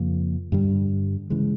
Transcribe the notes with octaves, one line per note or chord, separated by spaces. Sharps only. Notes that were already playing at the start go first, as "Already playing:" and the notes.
Already playing: F2 C#3 F3 A#3
G2 D3 G3
C#3 E3 G#3